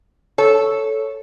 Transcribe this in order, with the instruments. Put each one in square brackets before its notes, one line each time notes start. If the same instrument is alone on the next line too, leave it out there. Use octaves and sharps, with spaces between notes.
[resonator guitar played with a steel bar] A4 [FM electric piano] C#5